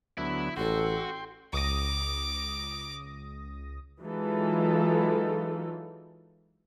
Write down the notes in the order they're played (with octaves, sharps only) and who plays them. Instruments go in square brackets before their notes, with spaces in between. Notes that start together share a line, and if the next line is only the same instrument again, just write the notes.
[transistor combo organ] D2 F#3 B3 [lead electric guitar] E4
[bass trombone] A1 [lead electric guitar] F#4 [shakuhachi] A4 [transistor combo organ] G5 C6
[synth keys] C#2 D#6 A#6 [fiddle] D6
[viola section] E3 F#3 G#3 D#4 F4 A4